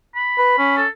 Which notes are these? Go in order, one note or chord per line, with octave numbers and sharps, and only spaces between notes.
B5
B4
C#4
A4